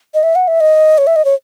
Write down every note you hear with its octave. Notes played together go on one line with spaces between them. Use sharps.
D#5
E5
F#5
E5
D#5
C#5
E5
D#5
C#5